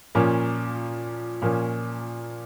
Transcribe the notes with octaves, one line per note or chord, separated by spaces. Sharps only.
A#2 F3 A#3 C#4
A#2 F3 A#3 C#4